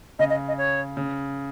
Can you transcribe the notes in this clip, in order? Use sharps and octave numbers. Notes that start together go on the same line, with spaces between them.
C#3 D#5
D#5
D#5
C#5
C#3